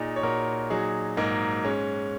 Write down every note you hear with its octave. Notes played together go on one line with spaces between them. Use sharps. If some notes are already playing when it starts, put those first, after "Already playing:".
Already playing: A#2 D#4 G#4
C#5
A#2 F#4 A#4
F#3 D#4 G#4
G#2 A#3 D#4
G#3 C#4